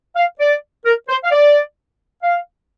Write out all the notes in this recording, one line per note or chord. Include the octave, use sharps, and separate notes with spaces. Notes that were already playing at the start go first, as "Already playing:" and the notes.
F5
D5
A#4
C5
F5
D5
F5